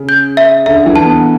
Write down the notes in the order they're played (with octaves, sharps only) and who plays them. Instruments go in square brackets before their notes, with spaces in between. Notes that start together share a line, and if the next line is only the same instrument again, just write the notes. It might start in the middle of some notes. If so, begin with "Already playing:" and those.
Already playing: [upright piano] C#3
[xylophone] G6
E5
[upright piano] D3 [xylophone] E5
[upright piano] E3
[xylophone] A5
[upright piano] B3